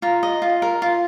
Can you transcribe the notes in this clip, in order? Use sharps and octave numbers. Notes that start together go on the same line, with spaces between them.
F4 A#5
D#5
F4
A#4
F4